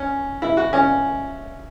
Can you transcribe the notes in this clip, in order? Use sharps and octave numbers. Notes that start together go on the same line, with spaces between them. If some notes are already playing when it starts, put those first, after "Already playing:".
Already playing: C#4
E4
F#4
C#4